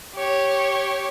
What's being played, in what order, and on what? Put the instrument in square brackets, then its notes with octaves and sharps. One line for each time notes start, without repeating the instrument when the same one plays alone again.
[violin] G4 C#5